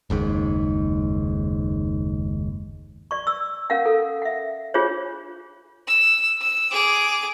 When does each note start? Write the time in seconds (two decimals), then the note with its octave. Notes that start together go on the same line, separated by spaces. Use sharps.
0.10 F#1 D#2 G#2
3.11 D5 C#6
3.27 E6
3.70 C#4 A#4 F5 F#5
3.86 A4
4.22 E5 F#5
4.74 D4 F4 G4 G#4 C5 C#5
5.87 E6
6.41 E6
6.72 G#4 D6